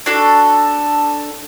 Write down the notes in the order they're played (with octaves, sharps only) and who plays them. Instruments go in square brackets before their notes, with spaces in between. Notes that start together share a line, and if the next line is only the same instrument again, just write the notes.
[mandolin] D4 F#4 A4